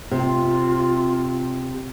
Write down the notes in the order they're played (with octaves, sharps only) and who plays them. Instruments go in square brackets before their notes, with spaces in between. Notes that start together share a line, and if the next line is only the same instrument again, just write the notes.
[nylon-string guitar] C3 [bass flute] F4